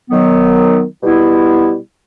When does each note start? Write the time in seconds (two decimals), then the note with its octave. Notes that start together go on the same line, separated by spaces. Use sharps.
0.09 D#3 F#3 B3
1.02 B2 G3 B3 E4